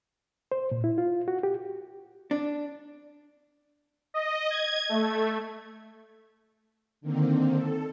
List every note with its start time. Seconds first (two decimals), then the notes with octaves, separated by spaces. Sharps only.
0.52 C5
0.72 A#2
0.84 E4
0.98 F4
1.28 F#4
1.43 G4
2.31 D4
4.14 D#5
4.50 G#6
4.89 A3
7.01 D3 D#3 A#3 C4
7.54 A4